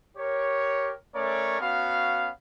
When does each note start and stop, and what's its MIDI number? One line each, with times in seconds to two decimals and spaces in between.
0.16 0.93 67
0.16 0.93 70
0.16 0.93 73
1.15 1.58 57
1.15 1.58 61
1.15 1.58 70
1.15 1.58 73
1.15 1.58 74
1.61 2.29 59
1.61 2.29 61
1.61 2.29 66
1.61 2.29 77